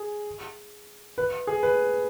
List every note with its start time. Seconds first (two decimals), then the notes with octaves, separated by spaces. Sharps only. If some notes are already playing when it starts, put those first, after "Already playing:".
Already playing: G#4
1.18 B4
1.47 G#4
1.63 B4